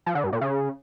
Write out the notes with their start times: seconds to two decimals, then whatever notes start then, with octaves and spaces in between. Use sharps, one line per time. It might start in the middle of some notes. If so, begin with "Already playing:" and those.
0.06 F3
0.15 D3
0.24 G2
0.33 A#2
0.41 C#3